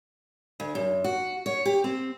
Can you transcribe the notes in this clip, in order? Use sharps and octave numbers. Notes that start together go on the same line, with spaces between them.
D2
F#2
F#4
C#5
G4
C4